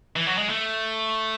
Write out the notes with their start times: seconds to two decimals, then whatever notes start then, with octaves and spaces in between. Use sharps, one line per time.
0.16 E3
0.27 F#3
0.38 G#3
0.49 A3